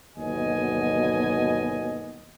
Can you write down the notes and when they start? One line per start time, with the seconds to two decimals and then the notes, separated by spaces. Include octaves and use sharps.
0.17 G1 D#2 B2 F#3 D#5 G#5